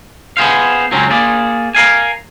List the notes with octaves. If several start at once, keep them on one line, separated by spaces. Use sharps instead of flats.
B3 G#4 C5 F5
C#2 F#2 F#3 C4 C#4
A#3 G#4 D5
A#4 F5 G#5